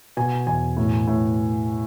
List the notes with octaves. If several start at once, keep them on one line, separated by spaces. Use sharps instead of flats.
B2 G#5
E2 G#5
A2
A2